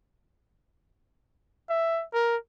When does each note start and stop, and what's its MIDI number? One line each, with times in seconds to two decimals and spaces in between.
1.69 2.03 76
2.13 2.36 70